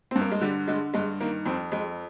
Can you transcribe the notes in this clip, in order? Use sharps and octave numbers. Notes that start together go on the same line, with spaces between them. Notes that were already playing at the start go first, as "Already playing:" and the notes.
G2 C4
A#3
G#3
D3 G3
D3 G#3
G2 G#3
D#3 A#3
F2 C4
F2 G#3